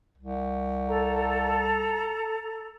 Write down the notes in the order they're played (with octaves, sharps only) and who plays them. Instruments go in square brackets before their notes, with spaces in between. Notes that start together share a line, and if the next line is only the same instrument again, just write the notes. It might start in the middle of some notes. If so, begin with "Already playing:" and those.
[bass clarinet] C2
[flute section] A4 A#5